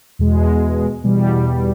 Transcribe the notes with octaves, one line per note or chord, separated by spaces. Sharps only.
E2 B2 G#3
E2 B2 G3